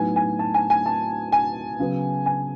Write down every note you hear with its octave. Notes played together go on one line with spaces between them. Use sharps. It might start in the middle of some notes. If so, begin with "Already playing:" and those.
Already playing: A2 F#3 B3 D#4 G#5
G#5
A5
G#5
G#5
A5
G#5
C#3 F#3 B3
G#5